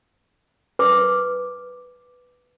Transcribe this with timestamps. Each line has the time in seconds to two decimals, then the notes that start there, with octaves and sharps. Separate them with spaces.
0.79 B4 D6